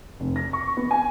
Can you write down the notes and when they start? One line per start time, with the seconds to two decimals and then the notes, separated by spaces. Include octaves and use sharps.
0.20 F1
0.36 A#6
0.53 C#6
0.77 B3
0.91 G#5